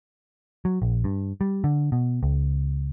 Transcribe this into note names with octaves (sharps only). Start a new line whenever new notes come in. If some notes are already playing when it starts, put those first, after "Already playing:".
F#3
A#1
G2
G3
D3
B2
C#2